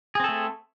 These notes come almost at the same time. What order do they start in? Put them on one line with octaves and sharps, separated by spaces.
G#4 C4 A4 A3